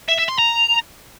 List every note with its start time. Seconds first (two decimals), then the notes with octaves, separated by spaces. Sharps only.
0.08 E5
0.18 E5
0.28 C6
0.38 A#5